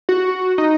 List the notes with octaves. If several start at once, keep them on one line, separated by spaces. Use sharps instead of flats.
F#4
D#4